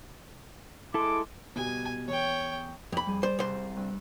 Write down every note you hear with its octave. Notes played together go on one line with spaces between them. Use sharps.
G#3 E4 A4 C6 D6
B2 G3 G#5
E2 C#5 G5
F2 B5
G3 G#4
C5 D5
C2 C5
G2 E6